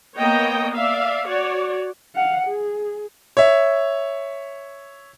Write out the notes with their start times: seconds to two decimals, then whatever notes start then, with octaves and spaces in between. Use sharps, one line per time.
0.16 A#3 B3 C#5 D#5 G5
0.74 D5 E5 F5
1.27 F#4 C#5 D5
2.16 F5 F#5
2.47 G#4
3.37 C#5 E5